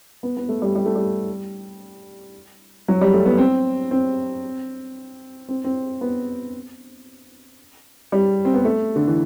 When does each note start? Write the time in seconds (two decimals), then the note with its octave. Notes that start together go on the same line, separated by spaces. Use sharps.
0.23 B3
0.37 B3
0.49 A3
0.62 G3
0.75 G3
0.86 A3
0.96 G3
2.88 F#3
3.01 G3
3.14 A3
3.25 B3
3.38 C4
3.91 C4
5.48 C4
5.64 C4
6.01 B3
8.12 G3
8.45 C4
8.54 B3
8.65 A3
8.96 D3
9.07 E3